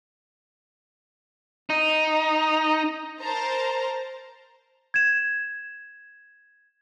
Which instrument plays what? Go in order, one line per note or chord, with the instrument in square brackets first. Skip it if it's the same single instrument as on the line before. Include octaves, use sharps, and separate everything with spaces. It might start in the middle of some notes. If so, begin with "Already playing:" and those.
[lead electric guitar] D#4
[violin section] A#4 C5 A5 A#5
[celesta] G#6 E7